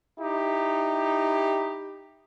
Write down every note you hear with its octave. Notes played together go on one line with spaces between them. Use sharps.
D#4 E4 G4